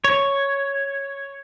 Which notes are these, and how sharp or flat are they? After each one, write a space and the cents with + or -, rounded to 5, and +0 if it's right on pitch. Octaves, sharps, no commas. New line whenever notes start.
C#5 +0